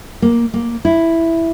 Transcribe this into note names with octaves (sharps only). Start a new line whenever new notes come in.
A#3
A#3
E4